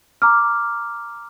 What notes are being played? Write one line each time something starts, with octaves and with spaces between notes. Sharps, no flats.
A#5 D6 F6